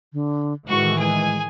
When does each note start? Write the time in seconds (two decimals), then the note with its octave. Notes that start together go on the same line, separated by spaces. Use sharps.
0.13 D3
0.68 A2 D#3 E3 G#3 F#4 C#6
0.98 G#3 G#4 G#5